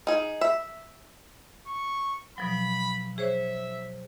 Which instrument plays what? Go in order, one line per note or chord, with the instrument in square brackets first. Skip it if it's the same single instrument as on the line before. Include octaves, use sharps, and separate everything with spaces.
[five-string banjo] D#4 G#4
E5
[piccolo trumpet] C#6
[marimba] B2 F3 F#3 [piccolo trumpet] B5
[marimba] G#4 C5 C#5 [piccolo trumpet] E5